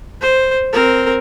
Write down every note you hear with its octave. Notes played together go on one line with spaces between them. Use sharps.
C5
C4 A#4